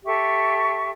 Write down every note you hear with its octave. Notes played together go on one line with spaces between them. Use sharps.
G4 A4 E5 C#6